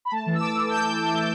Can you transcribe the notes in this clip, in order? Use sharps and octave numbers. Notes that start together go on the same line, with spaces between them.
B5
A3 A5
E3
E6
E3 D6
E3
E3 G6
E3
E3
A3